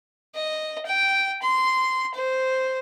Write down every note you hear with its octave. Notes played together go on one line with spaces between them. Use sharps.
D#5
G5
C6
C5